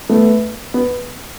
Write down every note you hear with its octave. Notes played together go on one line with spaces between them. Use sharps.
A3 B3
B3